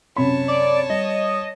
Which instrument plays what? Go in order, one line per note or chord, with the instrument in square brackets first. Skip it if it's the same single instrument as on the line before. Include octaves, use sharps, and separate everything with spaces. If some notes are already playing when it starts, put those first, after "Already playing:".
[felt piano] F#2 C3 B5 [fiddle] C#5 A5
[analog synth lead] D5
[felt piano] G3 [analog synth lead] D#5